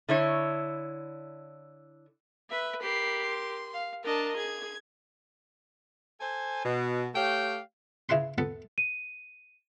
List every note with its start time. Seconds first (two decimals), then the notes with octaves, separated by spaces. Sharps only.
0.09 D3 E4 C#5
2.50 B4 E5
2.82 G4 A#4 B5 C7
3.26 C6
3.74 F5
4.04 D4 A#4 D#5 A5
4.37 G#4 G#6
6.20 A4 C5 G#5
6.65 B2
7.15 A3 G4 C#5 F5 G5
8.09 C#3 E4 G#4 B4 C6
8.38 B3 A4 B4
8.78 D#7